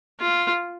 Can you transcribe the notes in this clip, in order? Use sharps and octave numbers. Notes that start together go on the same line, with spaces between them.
F4